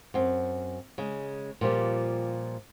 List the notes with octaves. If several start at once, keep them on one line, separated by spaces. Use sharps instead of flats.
F#2 C4
C#3 G#3
A#2 F3 G3 G4